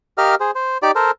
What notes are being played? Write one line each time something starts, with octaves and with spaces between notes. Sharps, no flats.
G4 A#4 D#5 F5 F6
G#4 C5
C5
D#4 G4 D5 D6
A4 A#4 C5